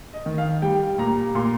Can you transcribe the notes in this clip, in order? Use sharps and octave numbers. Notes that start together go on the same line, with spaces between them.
D#5
D#3
F5
G3 G5
A#2 A#5
A#2 C6